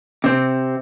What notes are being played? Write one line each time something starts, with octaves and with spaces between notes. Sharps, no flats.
C3 C4